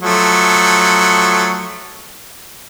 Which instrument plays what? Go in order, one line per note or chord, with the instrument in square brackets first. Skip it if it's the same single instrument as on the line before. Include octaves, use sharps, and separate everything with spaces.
[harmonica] F3 F#3 A3